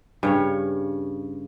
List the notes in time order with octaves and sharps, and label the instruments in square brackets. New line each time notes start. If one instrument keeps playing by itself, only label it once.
[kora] G2 C#3 C#5